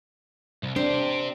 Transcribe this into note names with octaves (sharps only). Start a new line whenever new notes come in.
C2
C4 D4 G4 C5